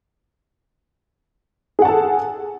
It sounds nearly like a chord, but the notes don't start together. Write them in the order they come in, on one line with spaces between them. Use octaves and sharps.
G#4 F#5 A5 A4